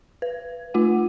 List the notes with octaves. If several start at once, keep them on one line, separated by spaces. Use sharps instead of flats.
B4
A3 F4 F#5